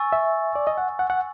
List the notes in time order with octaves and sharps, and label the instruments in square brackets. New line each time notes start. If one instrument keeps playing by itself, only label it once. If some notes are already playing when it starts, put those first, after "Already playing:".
Already playing: [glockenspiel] G#5 C#6 E6 A6
[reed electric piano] E5
D5
D#5
F#5
F#5
F#5